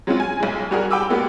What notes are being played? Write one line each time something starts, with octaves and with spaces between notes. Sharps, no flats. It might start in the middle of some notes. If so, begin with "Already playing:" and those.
F#3 G#3 C4 C#4 F4
G#5
B1 G#3
G3 F#4 G#4 A#4
G5 B5 D6 E6
G#3 A#3 B3 F#4 G4